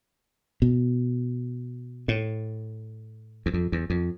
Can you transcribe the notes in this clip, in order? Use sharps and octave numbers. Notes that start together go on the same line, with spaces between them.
B2
A2
E2
F2
E2
F2